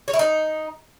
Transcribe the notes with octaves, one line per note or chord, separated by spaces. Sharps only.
C#5
E4
D#4